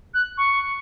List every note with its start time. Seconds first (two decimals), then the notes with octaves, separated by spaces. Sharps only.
0.14 F#6
0.37 C#6